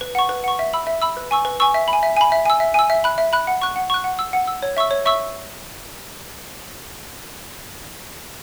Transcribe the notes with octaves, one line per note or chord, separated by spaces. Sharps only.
B4
F#5 C#6
B4
F#5 C#6
E5
B5 E6
E5
B5 E6
B4
G#5 C#6 E6
B4
G#5 C#6 E6
E5
B5
G#5
E5
G#5 B5
E5
G#5 E6
E5
G#5 E6
E5
B5 F#6
E5
B5 F#6
F#5
C#6 F#6
F#5
C#6 F#6
F#5
E6
F#5
E6
C#5
E5 C#6 E6
C#5
E5 C#6 E6